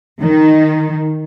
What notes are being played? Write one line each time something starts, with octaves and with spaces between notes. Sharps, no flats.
D#3